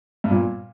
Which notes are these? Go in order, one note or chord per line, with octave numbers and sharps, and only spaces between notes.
G2
A#2